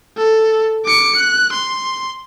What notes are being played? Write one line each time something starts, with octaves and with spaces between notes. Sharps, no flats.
A4
D6 C#7
F#6
C6